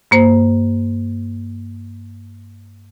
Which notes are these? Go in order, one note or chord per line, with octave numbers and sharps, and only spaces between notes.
G2 A#3 C5